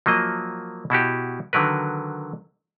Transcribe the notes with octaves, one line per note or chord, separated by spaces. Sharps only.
F3 F#3 A#3 D#5
B2 E4 F#4 G4
D3 D#3 F#3 A#4 B4